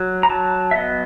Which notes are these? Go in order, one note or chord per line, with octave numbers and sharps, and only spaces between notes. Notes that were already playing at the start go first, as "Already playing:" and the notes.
Already playing: F#3
A#5
F#3 A5
E5
B3 D#5